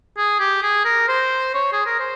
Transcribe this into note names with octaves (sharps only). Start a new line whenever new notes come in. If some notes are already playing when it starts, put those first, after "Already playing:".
G#4
G4
G#4
A#4
C5
C#5
G#4
A#4
C5